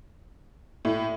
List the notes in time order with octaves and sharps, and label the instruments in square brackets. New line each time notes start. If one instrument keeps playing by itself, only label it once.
[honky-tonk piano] A2